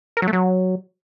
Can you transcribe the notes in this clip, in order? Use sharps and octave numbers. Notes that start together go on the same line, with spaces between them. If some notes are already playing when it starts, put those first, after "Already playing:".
A#4
F#3
A3
F#3